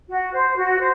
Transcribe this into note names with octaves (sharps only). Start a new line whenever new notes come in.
F#4
C5
F#4
C5